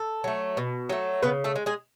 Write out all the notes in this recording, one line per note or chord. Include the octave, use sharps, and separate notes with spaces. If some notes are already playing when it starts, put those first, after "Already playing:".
Already playing: A4
F#3 A3
B2
F#3 A3
C#3 B3 B4
A3 A4
G#3
G#3 G#4